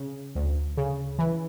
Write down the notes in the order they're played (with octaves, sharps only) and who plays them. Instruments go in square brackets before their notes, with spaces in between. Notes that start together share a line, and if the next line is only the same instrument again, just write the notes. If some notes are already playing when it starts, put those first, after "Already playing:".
Already playing: [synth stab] C#3
D2
C#3
E3